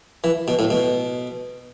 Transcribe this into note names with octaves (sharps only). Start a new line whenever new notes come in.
E3
B2
A2
B2